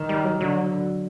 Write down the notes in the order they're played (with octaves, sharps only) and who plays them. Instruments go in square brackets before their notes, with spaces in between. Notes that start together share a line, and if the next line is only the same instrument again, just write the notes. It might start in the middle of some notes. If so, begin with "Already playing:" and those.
Already playing: [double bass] D#3
[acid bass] G3
F#3
[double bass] D3 [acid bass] F#3